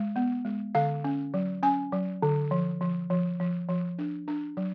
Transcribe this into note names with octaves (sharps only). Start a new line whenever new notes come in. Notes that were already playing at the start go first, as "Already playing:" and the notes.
Already playing: G#3
B3
G#3
D3 F5
C#4
F#3
C#4 G#5
F#3
D3
F3
F3
F3
F3
F3
D4
D4
F#3